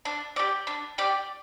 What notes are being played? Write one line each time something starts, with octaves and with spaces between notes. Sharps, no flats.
D4
G4 D5
D4
G4 D5